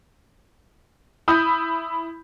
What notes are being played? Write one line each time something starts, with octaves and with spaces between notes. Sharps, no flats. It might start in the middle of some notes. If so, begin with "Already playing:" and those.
E4 B5 D#6 G6